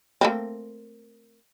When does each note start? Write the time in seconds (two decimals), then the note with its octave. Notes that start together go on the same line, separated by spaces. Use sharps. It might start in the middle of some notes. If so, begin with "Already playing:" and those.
0.21 A3 A#3 C4